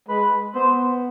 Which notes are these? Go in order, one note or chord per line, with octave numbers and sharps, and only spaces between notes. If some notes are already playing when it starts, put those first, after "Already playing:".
G#3 B4
B3 C5